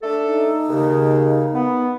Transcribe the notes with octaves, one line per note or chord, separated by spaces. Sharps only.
A3 D4 A4
D#4
D#2 C#3
B3